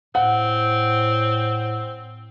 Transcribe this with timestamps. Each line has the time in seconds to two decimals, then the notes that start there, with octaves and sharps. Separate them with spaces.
0.15 A2 C4 F#5